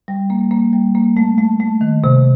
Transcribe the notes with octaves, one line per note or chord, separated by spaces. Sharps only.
G3
A#3
A#3
G3
A#3
A3
A3
A3
D#3
C3